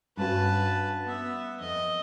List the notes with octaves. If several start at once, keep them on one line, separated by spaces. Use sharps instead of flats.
G2 C#4 F#4 B4 A5
B3 E5
F2 D#5